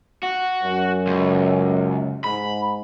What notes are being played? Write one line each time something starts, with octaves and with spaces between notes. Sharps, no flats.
F#4
F#2
C#2
G#2 B5